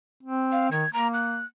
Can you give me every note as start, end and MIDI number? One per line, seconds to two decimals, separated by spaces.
0.23 0.68 60
0.52 0.68 77
0.71 0.85 51
0.71 0.92 92
0.93 1.42 58
0.93 1.08 82
1.14 1.45 90